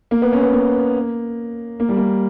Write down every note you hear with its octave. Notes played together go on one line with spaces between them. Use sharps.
A#3
B3
C#4
B3
A#3
A#3
G3
A#3